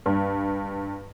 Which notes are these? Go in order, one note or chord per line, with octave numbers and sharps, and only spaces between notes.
G2